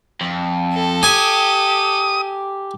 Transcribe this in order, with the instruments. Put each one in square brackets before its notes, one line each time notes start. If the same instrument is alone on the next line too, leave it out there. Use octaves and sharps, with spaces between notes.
[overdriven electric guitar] F2
[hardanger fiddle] A4
[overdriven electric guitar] G4 [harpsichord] G#5 [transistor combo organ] D#6